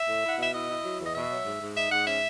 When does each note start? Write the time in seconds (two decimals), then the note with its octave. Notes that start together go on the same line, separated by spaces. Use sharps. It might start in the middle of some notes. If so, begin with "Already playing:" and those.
Already playing: E5
0.09 A2
0.24 E4
0.29 F#5
0.38 B2 E5
0.54 E4 D#5
0.69 E4
0.85 F#3
1.00 E2
1.06 D#5
1.15 B2 E5
1.30 F#3
1.46 G#2
1.61 G#2
1.76 D#4 E5
1.91 G#2 F#5
2.06 C#4 E5